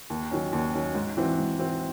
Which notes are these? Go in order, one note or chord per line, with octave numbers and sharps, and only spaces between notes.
D#2
D#3 F#3 C#4
D#2
D#3 F#3 C#4
G#2
E3 C4 F#4
G#2
E3 C4 F#4